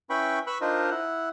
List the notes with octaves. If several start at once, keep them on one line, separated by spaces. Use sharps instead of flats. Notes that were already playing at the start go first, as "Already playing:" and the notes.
C#4 E4 B4 G5 B5 C#6
B4 B5 C#6 E6 F#6
D4 D#4 F4 A#4 C5 D#5
E4 F#5